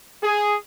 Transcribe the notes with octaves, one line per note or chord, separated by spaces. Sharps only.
G#4